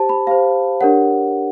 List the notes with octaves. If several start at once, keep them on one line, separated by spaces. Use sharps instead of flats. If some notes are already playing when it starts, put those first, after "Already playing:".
Already playing: G4 C5 A5
B5
G4 C5 F5
D4 G4 A#4 C#5 F#5